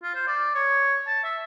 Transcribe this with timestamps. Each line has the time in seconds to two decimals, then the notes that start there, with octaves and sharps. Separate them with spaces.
0.03 F4
0.15 C5
0.27 D5
0.55 C#5
1.07 A5
1.24 E5